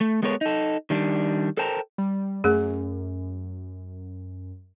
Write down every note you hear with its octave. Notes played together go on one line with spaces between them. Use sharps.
A3
G#3 B3 A4 A#4 C#5
D#4 A4
D#3 G3 D4
A4 A#4 C5 G5 A5 A#5
G3
F#2 A3 G#4